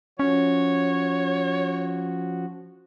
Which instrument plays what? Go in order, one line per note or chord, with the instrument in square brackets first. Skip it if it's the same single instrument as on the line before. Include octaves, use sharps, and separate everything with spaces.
[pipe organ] F3 F#4 [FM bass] C#4 [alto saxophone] C#5